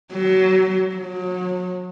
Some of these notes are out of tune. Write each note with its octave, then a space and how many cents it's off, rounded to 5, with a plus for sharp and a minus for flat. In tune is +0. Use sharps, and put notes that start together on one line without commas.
F#3 +25
F#3 -30